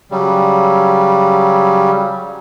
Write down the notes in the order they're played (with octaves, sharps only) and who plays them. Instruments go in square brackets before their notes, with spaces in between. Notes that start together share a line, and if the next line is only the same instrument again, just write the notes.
[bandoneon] C#3 F#3 G3